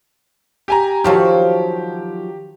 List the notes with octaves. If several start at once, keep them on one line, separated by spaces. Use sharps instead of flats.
G4 G#5 A#5
D#3 F3 F#3 G4